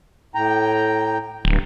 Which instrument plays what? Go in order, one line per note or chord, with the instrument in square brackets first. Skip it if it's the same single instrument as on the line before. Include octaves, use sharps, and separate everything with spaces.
[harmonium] A2 G5 A#5
[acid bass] D1 [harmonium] G2